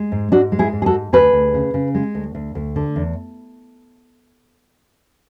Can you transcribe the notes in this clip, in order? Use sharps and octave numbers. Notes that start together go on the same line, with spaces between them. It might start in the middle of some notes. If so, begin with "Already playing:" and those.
Already playing: G#3
G#2
G#2 D4 F#4
G#3
E4 G#4
G#2
G#4
F#4 A4
G#2
D2 G#4 B4
D2
C#3
C#3
G#3
D2
D2
D2
D3
E2